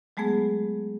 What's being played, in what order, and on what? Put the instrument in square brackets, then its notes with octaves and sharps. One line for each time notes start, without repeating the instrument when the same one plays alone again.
[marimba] F#3 G#3 A3 B3 G#4